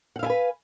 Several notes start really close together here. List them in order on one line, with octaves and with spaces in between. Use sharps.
F#5 F5 E4 G#5 B4